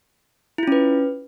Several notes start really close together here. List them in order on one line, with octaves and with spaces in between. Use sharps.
E4 F4 C#4 B4